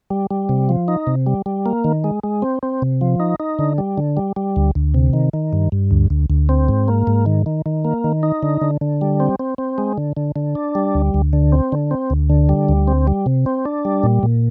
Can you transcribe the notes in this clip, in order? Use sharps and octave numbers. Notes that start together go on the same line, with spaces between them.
G3
G3
C3
F3
D#4
C3
G3
G3
A#3
D#3
G#3
G#3
C4
C4
C3
F3
D#4
D#4
D3
G3
D3
G3
G3
D2
D2
C3
D#3
D#3
G2
G2
D2
D2
D2
C4
G#2
A#3
G#2
D#3
D#3
D#3
A#3
D#3
D#4
D3
D3
D3
G3
C4
C4
C4
G#3
D3
D3
D3
D4
G3
D2
D2
D3
C4
D3
C4
D2
D3
G3
D2
C4
G3
C3
C4
D4
G3
A#2
A#2